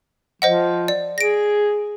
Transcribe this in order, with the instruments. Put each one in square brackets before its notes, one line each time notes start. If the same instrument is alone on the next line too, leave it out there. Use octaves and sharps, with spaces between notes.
[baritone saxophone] F3 [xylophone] C5 D#5 F#5
[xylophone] D5
[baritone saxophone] G#4 [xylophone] A#6 D7